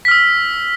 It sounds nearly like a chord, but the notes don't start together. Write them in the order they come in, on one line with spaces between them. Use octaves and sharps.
B6 F6 E6